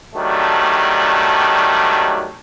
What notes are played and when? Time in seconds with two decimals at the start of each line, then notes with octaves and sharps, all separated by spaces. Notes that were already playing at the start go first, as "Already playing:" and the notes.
0.16 D#3 F#3 G3 A3 D4